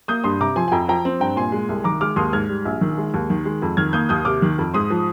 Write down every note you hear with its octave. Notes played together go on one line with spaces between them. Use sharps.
A#3 D#6 G6
G2 C6 D#6
C3 A#5 D6
F3 G#5 C6
G#5
F2 G5 A#5
F3 G5 A#5
C4
G2 G5 A#5
A#2 G#5 C6
G#3
C2
D#3 A#5 D6
G#3 D6 F6
D#2 C6 D#6
G#2 F6 G#6
G3
A#1
D#3
G#3
D#2
D#3
G#3
F2
D#3 F6 G#6
A#3 D#6 G6
D#2 D#6 G6
C3 D6 F6
D#3
F2
G#2 C6 D#6
F3